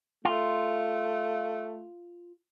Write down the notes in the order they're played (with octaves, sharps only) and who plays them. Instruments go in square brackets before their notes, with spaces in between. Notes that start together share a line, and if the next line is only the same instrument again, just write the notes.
[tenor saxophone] A3 [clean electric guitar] F4